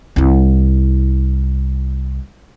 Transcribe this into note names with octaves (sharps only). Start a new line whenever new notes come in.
C2 E4